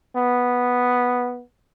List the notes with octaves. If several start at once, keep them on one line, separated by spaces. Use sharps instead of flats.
B3